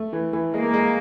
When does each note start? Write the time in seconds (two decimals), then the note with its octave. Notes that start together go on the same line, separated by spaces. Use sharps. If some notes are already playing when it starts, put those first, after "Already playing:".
Already playing: A3
0.13 E3
0.33 E3
0.53 G#3 A#3
0.74 G#3